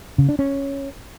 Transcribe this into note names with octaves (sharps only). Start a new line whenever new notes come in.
C#3
D4
C#4